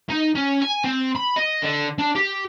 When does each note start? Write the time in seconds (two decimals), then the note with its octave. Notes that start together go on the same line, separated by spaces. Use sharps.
0.09 D#4
0.35 C#4
0.62 G#5
0.85 C4
1.16 B5
1.37 D#5
1.62 D3
1.98 D4
2.15 G4